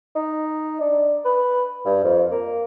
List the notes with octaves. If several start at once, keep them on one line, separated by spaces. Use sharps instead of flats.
D#4
D4
B4
G2
F2
A#3